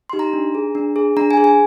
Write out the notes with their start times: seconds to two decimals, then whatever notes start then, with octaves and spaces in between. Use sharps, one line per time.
0.10 D#4 G4 C6
0.19 A#5
0.33 D4
0.55 G#4
0.75 D4
0.96 G#4
1.17 D4 A#5
1.31 G#5
1.37 G#4
1.44 G#5